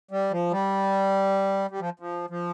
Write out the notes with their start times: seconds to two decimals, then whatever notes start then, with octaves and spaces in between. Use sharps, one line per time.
0.11 G3
0.31 F3
0.51 G3
1.71 G3
1.80 F3
2.00 F3
2.30 F3